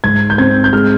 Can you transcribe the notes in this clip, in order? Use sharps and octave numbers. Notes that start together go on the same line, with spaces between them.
G#2 G#6
G6
C4 G#6
G6
G#3 F6